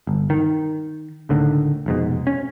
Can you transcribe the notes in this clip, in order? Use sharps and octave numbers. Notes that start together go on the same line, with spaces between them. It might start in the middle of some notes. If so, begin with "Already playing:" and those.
G1
D#3
C#2 A2 D3 D#3
F1 G#2 B2
C#4